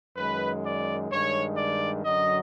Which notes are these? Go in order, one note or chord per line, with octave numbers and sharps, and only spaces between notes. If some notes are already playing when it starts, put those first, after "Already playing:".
F#2 D#3 G#3 B4
D5
G2 D#3 G#3 C#5
D5
F#2 D3 F#3 D#5